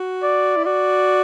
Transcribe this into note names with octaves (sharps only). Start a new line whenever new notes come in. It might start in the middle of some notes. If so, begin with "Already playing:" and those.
Already playing: F#4
D5
E4
F#4 D5